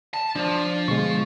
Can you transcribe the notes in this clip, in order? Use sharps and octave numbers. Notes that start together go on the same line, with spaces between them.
A5
F3 D4
B2 D3 G#3 C#6